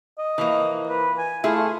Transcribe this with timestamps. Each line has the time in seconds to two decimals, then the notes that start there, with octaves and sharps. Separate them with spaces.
0.18 D#5
0.38 E3 F3 A#3
0.88 B4
1.18 G#5
1.44 A3 E4 F4 G#4